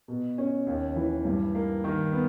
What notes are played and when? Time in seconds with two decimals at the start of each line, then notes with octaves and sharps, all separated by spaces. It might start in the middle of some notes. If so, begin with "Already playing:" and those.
0.08 B2
0.38 C#4
0.67 D#2
0.96 E3
1.25 G2
1.55 A#3
1.84 D#3
2.13 B3